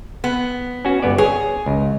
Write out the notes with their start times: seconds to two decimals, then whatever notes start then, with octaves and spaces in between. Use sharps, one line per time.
0.24 B3
0.85 C#4 F#4
1.02 G1 B3 D5
1.18 G#4 C#5
1.66 C#2